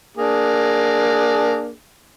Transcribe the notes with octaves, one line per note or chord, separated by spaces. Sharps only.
A#3 D4 G#4